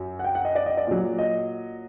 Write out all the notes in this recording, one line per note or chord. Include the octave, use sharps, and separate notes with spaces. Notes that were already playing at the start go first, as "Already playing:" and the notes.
Already playing: F#2 F#3
F#5
G5
F#5
D#5
D5
D#5
D5
A#2 F#3
D#5